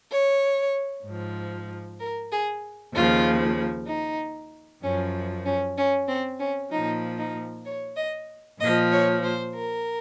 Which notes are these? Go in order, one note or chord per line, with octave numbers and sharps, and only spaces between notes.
C#5
G#2 F3
A#4
G#4
D#2 C#3 F3 F4
D#4
F#2 F3 C#4
C#4
C#4
C4
C#4
A#2 F3 D#4
D#4
C#5
D#5
A#2 F3 D#5
C#5
C5
A#4